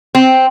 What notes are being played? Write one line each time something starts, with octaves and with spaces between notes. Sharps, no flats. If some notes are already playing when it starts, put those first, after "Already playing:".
C4